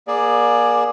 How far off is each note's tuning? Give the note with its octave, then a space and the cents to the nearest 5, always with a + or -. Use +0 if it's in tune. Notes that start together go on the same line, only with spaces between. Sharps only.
A#3 +30 G#4 +0 D5 +0